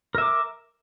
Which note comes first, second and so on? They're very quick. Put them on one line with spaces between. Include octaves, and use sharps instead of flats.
A#4 E5 D6